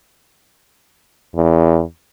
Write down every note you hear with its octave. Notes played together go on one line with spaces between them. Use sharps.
E2